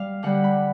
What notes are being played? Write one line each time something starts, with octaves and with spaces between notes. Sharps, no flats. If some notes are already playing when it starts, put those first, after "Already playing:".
Already playing: G3 F5
D3 G3 F#5
B5